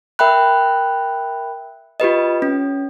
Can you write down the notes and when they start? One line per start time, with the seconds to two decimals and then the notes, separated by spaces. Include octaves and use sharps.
0.19 A#4 E5 G5 B5 F#6
2.00 F4 G4 B4 D#5
2.42 C#4